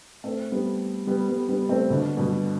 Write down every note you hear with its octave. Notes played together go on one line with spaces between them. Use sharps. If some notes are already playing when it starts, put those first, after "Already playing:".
A3 C4
G3 B3
G3 B3
G3 B3
G3 B3
A3 C4
B2 D3
G2 B2